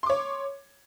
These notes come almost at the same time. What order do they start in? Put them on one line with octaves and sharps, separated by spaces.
C6 D6 C#5